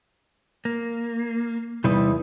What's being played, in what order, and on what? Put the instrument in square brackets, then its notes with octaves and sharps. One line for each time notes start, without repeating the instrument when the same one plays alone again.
[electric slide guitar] A#3
[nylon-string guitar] E2 E4 [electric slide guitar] C3 G3 D#4